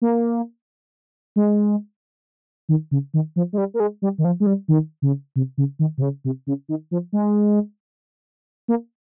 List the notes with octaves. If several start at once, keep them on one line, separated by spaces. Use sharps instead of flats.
A#3
G#3
D#3
C#3
D#3
F3
G#3
G3
A#3
G#3
G3
D#3
F3
G#3
G3
D#3
C#3
C3
C#3
D#3
C3
C#3
C3
C#3
D#3
F3
G#3
A#3